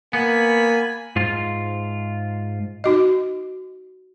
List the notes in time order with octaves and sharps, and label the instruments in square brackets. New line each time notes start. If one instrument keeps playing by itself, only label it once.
[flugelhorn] A#3 [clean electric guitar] B3 [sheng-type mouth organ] G#5 B5
[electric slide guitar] G#2 F4
[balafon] D#4 F#4 D#5